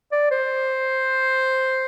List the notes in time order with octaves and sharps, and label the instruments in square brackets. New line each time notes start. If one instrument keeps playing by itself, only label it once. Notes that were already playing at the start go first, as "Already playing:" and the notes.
[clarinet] D5
C5